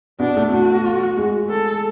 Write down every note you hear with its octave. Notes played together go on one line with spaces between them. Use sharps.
B2 B3 D4
A3
A3 F#4
G#3
A4